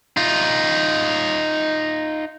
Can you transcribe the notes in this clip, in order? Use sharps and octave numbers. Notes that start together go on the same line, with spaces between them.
D#4 F4